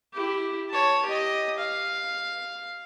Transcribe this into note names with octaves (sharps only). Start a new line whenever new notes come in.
E4 G4
C#5 A5
G4 D#5
F5